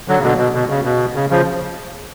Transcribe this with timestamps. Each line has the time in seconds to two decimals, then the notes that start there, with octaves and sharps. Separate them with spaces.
0.08 D3 F#3
0.18 C#3
0.23 B2 D3
0.38 B2
0.54 B2
0.70 C#3
0.84 B2
1.15 C#3
1.30 C#3 F3